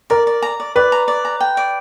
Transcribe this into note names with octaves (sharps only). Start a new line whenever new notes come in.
A#4 D5
D5
A#5
D5
B4 D5
A#5
D5
A#5
G5
D5